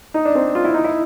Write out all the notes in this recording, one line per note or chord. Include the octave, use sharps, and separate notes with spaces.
D#4
D4
C4
F4
E4
D#4
E4